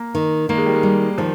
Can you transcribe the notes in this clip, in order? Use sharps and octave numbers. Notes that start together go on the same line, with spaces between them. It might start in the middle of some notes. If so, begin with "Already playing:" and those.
Already playing: A#3
D#3
D#3 A#3
G#3
G3
G#3
G3
D#3 F3